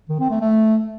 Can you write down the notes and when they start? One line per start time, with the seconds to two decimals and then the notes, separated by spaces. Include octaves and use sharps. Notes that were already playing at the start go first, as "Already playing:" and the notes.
0.09 D#3
0.20 C4
0.30 A3
0.41 A3